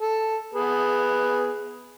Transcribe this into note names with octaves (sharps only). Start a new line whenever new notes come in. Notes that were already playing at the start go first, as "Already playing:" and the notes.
A4
B3 G#4 B4